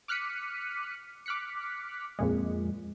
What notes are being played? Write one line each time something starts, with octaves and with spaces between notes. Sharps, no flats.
D6 F6 F#6 B6 C#7 D#7
D6 F6 F#6 B6 C#7
F2 A#2 G#3